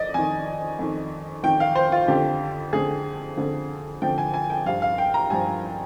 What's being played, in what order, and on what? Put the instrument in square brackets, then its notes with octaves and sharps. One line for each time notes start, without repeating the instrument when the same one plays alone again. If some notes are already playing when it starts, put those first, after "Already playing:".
Already playing: [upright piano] F2 D5 D#5
F2 D#3 G#5
F2 D#3
F2 D#3 G5
F5
C5
F4
F2 D3 F3 G4
F2 D3 F3 G#4
F2 D3 F3
F2 D3 F3 G5
G#5
G#5
G5
G2 F3 F5
F5
G5
A#5
G2 F3 G#5